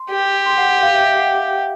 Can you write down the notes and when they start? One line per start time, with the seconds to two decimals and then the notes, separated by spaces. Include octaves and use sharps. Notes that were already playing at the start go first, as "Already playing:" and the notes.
Already playing: C6
0.10 G4
0.46 C6
0.57 F#5
0.69 F#5
0.82 F5
0.94 E5
1.06 E5
1.13 G5
1.17 F#5